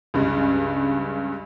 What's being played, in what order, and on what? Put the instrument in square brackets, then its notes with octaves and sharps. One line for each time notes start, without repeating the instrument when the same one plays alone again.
[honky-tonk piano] C#2 G2 C#3